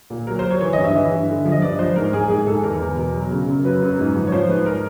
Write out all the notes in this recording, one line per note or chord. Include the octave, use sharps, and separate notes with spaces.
A#2
F#3 A#4
C5
F#3
C#5
E3 C#5
G2 D#5
E5
E3
G2
D3
F3
D#5
G2 D5
F3 C5
G#2 A#4
G#2 G#4
G#2 G#4
G#2 A4
E2 A#4
E2
B2
F#3
C#3
F#2
F#3 B4
F#2
G#2
F3
C#5
F3 C5
G#2 B4
A#4